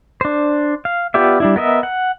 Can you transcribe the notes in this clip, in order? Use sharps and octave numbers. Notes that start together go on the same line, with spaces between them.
D4 C5
F5
B3 F4 G4 D5 E5
G3 D4 E4
B3 A#4 D#5 E5
F#5